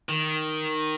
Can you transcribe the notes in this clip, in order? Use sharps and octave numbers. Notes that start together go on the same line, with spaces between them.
D#3